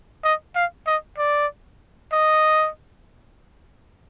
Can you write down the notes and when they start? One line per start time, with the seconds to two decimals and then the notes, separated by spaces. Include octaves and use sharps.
0.24 D#5
0.56 F5
0.87 D#5
1.18 D5
2.13 D#5